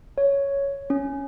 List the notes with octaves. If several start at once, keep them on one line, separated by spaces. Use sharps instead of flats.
C#5
C#4